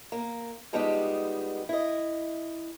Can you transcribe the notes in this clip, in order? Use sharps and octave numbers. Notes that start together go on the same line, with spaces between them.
A#3
F3 G3 G#3 B3 D#4 G4
E4 D#5